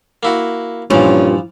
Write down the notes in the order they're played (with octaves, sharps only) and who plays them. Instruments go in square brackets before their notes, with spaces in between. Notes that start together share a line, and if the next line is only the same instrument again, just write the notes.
[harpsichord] A#3 E4 F#4
[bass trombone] G2 [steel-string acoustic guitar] A#2 [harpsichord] E3 F3 [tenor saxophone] C#4